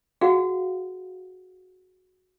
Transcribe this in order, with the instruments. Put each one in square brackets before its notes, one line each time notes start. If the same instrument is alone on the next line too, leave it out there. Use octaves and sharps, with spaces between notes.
[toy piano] F#4 G#4 F5 F#5